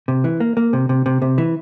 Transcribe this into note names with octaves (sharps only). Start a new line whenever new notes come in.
C3
E3
A#3
A#3
C3
C3
C3
C3
E3